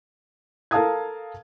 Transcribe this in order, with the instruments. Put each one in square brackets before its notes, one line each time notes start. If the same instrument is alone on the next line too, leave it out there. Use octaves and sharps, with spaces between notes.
[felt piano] A4 A#4 F5 A5 D#6 G#6